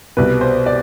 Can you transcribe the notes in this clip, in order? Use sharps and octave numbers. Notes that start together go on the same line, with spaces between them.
C2 B2 B4
C5
D5